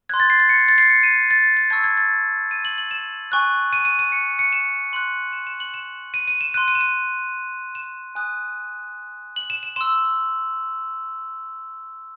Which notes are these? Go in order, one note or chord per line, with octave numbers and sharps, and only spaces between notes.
C6 F#6 G#6
A6
C7
A6
C#7
C7
A6
C7
C#7
D#7
A6
C7
A6
A5 C#6 E6 G#6
G#6
A6
D#7
F#7
F#7
E7
G#5 C#6 F#6
D#7
D#7
D#7
C#7
C#7
E7
C6 F#6 F#7
E7
E7
F#7
E7
D#7
D#7
E7
C6 F#6 D#7
D#7
E7
D#7
E7
G#5 D#6 F#6
F#7
E7
E7
C6 E6 E7